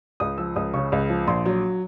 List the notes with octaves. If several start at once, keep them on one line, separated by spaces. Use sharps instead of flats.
C#2 D#6
F3 E6
C#2 D#6
C#3 C#6
C#2
F3
A#1 C6
F#3